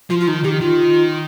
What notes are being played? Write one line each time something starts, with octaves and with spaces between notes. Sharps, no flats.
F3 F4
F4
D#3 D#4
D#3 G4
D#3 F4